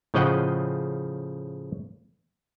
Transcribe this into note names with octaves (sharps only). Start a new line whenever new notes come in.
A2 C#3 F3 D#5 F#5 G5